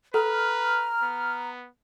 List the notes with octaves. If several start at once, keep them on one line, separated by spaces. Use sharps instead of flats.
A4 B4 A#5 F6
B3